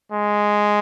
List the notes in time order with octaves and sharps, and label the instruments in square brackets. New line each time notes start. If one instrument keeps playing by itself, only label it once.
[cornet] G#3